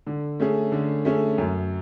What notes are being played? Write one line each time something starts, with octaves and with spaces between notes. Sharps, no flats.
D3
A3 C#4 G#4
D3
A3 C#4 G#4
F#2